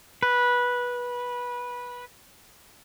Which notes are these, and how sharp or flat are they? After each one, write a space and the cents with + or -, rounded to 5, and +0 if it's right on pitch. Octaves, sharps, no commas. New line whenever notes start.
B4 -15